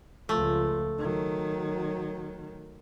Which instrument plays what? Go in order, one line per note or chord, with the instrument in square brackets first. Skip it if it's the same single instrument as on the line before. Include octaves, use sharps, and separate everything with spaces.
[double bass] C#2 F3 [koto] A3
[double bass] D#3 F#3